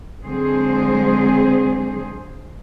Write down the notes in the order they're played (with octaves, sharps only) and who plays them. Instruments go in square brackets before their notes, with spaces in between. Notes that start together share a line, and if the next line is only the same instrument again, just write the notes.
[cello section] D3 F#3 G#3 C4 G#4 C5